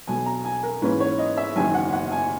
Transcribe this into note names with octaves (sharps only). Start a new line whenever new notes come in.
B1 B2 F#3 B3 G#5
A#5
G#5
A#4
G#2 E3 A#3 C#4 B4
C#5
D#5
E5
F#1 F#2 D#3 F#3 G#5
F#5
F#5
G#5